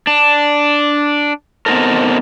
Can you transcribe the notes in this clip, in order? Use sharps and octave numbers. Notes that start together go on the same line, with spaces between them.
D4
B3 C4 D#4 A4 A#4